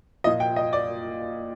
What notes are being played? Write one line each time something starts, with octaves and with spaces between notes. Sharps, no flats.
A#2 F3 D#5
G5
D#5
D5